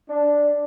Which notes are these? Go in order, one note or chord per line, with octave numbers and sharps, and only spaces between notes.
D4